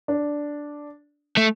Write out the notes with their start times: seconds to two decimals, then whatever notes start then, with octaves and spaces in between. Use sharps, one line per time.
0.08 D4
1.37 A3